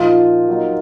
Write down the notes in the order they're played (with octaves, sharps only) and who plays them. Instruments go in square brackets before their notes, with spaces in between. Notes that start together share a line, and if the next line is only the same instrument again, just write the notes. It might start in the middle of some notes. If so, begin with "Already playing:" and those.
Already playing: [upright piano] A#2 F3 A#3 D#4 [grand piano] F4
[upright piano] F#3 A#3 D#4